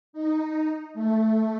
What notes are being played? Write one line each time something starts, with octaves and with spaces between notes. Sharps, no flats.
D#4
A3